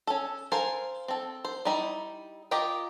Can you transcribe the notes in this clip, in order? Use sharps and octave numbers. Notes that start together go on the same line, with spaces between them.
C#4 A4
A4 A#4 C5 F5 G#5
C4 A4
C5
G3 D#4 E4
F4 G4 A#4 D#5 G5